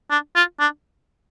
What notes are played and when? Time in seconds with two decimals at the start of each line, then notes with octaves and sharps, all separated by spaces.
0.10 D4
0.35 F4
0.59 D4